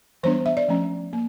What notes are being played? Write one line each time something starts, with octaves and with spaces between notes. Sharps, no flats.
E3 G3 B3 D4 C5
E5
D5
F3 A3 C#4
A#3